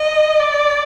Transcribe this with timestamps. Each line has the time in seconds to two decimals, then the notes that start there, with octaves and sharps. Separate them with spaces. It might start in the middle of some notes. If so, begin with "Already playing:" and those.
Already playing: D#5
0.40 D5